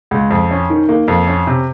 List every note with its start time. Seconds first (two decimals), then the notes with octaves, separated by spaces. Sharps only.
0.11 C#2
0.30 F2
0.51 C#4
0.70 D#3
0.89 A#3
1.08 F2
1.27 C#4
1.47 C3